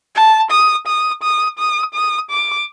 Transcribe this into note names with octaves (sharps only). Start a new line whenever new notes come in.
A5
D#6
D#6
D#6
D#6
D#6
D6